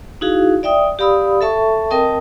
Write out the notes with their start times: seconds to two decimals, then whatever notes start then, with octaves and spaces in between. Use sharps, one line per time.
0.21 D#4 E4 F#4 G#4 F5
0.63 D5 E5 G5 D#6
0.99 G4 D5 F5 B5 D#6 E6
1.41 A4 E5 A5 C#6
1.90 C4 A#4 D#5 G5 A5 D#6